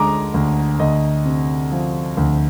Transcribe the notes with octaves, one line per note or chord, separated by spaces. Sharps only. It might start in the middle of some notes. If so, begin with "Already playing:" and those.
Already playing: D2 D3 G#3 G#5 A#5 D6
D2
D2 D#5
C3
F3
D2